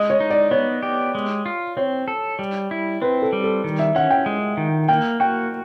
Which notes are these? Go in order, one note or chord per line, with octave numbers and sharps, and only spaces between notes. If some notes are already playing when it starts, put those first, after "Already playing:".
Already playing: G#3 D#5
C#5
D#4
D5
B3 C#5
G4
G#3
F4
C4 C#5
A4
G3
E4
C4 B4
A4
G3
A4
D#3
E5
C#4 F#5
G5
G#3
D#3
A#3 G5
F#4 G5